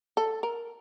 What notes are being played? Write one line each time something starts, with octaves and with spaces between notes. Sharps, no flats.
A4
A#4